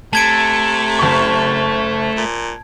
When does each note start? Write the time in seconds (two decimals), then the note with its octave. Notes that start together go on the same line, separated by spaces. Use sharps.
0.13 C3 A3 A5 G#6 D7
0.99 F#1 C#6
2.17 A#2